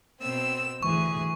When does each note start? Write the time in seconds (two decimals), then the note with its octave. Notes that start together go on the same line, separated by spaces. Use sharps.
0.21 B2 C4 E6
0.83 D2 E3 G#4 C#6